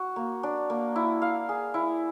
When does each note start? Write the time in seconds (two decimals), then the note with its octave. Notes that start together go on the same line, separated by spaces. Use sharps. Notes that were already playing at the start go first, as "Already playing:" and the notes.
Already playing: F#4
0.16 A#3
0.43 D4
0.70 A#3
0.96 E4
1.22 F5
1.49 G#4
1.74 E4